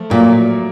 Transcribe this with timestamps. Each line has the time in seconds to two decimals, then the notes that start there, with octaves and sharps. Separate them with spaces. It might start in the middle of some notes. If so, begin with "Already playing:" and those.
Already playing: F3 A3
0.10 A#2 F#3 A#3